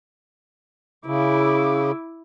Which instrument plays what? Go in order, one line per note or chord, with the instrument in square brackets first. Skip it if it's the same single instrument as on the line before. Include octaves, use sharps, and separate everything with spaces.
[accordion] C#3 [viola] E4 D6